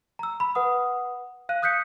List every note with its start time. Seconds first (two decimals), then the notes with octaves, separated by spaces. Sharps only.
0.19 A#5 E6
0.40 B5
0.55 B4 F#5 D#6
1.49 F5 F#6 D#7
1.62 D#6 F#6 G6 B6 C#7